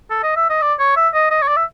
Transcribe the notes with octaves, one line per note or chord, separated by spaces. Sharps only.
A4
D#5
E5
D#5
D5
C#5
E5
D#5
D#5
C#5
D5
E5